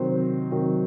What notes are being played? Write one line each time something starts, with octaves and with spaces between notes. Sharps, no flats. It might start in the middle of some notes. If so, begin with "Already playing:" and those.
Already playing: C3 D#3 F#3 C5
C3 D#3 F#3